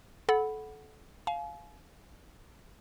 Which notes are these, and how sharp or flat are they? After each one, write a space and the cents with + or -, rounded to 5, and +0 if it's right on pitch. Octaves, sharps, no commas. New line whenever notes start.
A4 -25 F#5 +0 B5 +0
F5 +0 G#5 +40